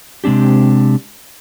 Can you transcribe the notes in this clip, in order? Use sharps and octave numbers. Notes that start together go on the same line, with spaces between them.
C3 G#3 C4 D4 G4